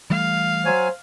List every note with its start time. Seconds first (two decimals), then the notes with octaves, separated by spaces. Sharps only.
0.10 E3 G3 A3 F5
0.65 F#3 C5 C#5 G#5